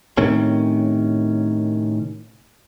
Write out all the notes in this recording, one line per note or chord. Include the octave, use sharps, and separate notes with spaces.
A2 C3 D#3 C#4